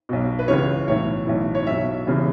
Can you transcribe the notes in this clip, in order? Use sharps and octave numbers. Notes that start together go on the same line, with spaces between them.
B1 B2
B4
C#2 C#3 E3 C#5
B1 A2 E3 C#5
B1 A2 E3
C#5
B1 B2 E5
E1 E2 C#3 E3